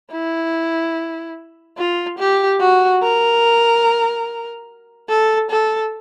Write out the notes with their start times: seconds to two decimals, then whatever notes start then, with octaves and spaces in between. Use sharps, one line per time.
0.11 E4
1.77 F4
2.18 G4
2.60 F#4
3.02 A#4
5.09 A4
5.50 A4